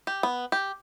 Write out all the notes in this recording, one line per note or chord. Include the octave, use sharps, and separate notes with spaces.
G4
B3
G4